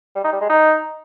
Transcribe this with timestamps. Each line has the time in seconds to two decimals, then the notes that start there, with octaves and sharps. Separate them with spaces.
0.15 G3
0.24 D#4
0.32 G3
0.41 G#3
0.49 D#4